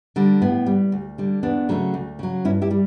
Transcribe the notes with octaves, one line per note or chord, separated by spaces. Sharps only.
D3 G3
A2 B3
G3
D2
D3 G3
E2 B3 D4
C#3 F#3 A3
D2
C#3 F#3
G2 C#4 E4
E4 G4
G3